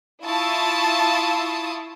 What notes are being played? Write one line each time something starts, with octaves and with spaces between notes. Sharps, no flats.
E4 F4 A5 C#6 D#6 E6